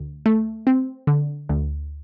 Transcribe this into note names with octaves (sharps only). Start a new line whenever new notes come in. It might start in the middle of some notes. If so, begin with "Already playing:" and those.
Already playing: D2
A3
C4
D3
D2